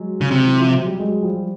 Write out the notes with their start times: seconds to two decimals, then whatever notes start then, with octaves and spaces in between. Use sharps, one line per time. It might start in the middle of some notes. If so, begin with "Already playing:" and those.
Already playing: F#3 G#3
0.21 C#3
0.31 C3
0.46 E3
0.59 F3
0.73 F#3
0.86 G3
1.00 F#3 G#3
1.23 F3 G3